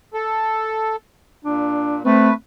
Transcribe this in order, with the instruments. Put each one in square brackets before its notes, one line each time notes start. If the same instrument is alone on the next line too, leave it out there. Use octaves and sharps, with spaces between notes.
[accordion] A4
[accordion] A#2 [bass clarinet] D4
[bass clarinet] A3 [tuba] C4 [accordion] B4